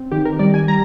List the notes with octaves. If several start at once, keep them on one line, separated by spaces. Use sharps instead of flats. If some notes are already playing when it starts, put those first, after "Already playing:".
Already playing: C4
D#3 G4
A#4
G3 D5
G#5
G3 A#5